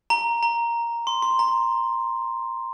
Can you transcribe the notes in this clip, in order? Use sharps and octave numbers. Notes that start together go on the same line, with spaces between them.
A#5
A#5
C6
C6
A#5